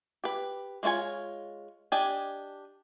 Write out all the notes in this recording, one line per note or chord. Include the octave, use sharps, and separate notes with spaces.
G4 B4
G#3 A#3 F4 C#5 G#5
D4 G4 D#5 G5 G#5